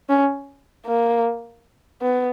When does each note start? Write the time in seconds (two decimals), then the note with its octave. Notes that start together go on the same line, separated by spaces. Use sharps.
0.09 C#4
0.86 A#3
2.02 B3